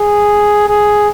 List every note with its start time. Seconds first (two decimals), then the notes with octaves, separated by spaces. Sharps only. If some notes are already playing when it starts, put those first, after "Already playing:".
Already playing: G#4
0.68 G#4